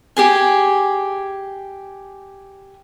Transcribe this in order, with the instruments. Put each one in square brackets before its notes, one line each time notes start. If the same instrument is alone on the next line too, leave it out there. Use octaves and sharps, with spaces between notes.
[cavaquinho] G4 G#4 G#5